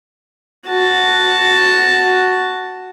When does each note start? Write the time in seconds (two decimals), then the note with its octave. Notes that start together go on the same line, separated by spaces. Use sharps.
0.67 F#4 A5